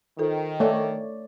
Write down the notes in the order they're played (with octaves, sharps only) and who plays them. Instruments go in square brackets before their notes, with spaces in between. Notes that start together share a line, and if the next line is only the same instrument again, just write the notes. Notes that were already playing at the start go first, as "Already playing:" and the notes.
[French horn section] D#3 [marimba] F4 A4 C5
[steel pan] A3 [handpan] C#5 D5